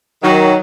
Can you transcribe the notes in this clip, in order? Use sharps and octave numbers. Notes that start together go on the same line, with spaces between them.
D#3 F#3